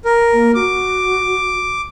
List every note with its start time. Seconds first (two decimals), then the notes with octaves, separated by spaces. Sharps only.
0.05 A#4
0.33 A#3
0.55 F#4 D6